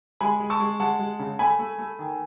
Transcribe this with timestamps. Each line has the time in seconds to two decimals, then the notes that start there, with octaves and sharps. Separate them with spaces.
0.21 G#3 G#5 B5
0.40 G#3
0.50 A5 C#6
0.60 G#3
0.80 G#3 F#5 A5
0.99 G#3
1.19 C#3
1.39 A3 G#5 B5
1.59 A3
1.79 A3
1.99 D#3